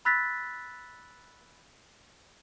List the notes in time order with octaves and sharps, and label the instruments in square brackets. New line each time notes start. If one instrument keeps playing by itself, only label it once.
[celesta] B5 E6 F#6 A6 B6